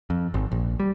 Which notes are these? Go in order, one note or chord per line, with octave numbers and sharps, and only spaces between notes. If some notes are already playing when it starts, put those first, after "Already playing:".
F2
G#1
A#1
G3